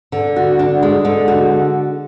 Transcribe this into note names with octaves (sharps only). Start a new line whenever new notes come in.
D3
F#4
D4
G#3
D3
F#4